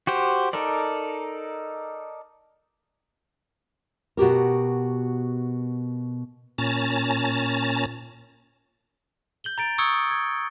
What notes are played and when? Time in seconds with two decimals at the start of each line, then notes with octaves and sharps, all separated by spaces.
0.07 F#4 G4 C5
0.53 D#4 A4 A#4 D5
4.17 B2 F#4 G4 A#4
6.58 A#2 C#4 A5 A#5 A6
9.44 G6 F#7 G7
9.58 A#5 A6 D7
9.78 C#6 D#6 E6 G#6 C#7 G7
10.11 G#6